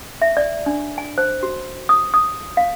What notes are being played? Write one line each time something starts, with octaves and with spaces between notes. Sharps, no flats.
E5
D5
D4
G#5
C5
F#4
D#6
D#6
F5